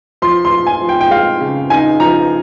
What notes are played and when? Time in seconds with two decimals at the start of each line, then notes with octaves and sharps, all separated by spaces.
0.22 F3 C6
0.45 C6
0.52 F3
0.67 G#5
0.81 F3
0.89 G5
1.01 G5
1.11 G#3 F5
1.41 C#3
1.70 D#4 G#5
2.00 F3 A#5